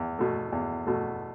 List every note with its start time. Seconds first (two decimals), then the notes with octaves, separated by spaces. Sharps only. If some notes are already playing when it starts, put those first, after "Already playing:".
Already playing: E2
0.19 B2 A3
0.52 E2
0.87 B2 A3